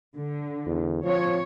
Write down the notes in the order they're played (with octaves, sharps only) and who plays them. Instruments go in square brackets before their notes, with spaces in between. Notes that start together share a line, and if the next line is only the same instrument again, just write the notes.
[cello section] D3
[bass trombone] E2
[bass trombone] F3 [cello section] C4 C#5